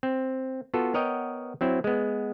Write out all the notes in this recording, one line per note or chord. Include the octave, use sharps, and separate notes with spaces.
C4
B3 F4 F#4 A4
B3 A#4 C#5 D#5 F#5 G5
F#3 C4 E4
G#3 B3